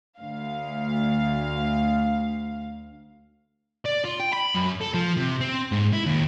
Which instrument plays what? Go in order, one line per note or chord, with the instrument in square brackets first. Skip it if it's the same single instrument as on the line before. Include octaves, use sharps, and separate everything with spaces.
[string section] D2 F5
[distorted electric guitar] D5
F4
G5
B5
F#2
A4
F3
C3
C4
G#2
E4
D#2